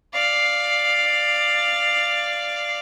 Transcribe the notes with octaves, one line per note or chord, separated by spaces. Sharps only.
D5 F5